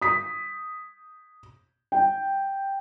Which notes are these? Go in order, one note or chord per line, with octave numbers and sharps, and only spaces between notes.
D#6 B6
G5